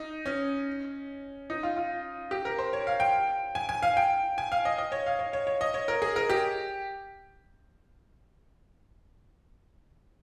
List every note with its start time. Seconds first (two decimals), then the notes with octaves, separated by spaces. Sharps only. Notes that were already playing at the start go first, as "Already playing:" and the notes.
Already playing: D#4
0.26 C#4
1.50 D#4
1.63 F4
1.77 F4
2.31 G4
2.45 A#4
2.59 C5
2.73 C#5
2.87 F5
3.00 G5
3.55 G#5
3.69 G#5
3.82 F5
3.97 G5
4.38 G#5
4.52 F5
4.65 D#5
4.78 D#5
4.92 C#5
5.06 F5
5.19 C#5
5.33 C#5
5.47 C#5
5.61 D#5
5.74 C#5
5.88 A#4
6.02 G#4
6.16 A#4
6.30 G4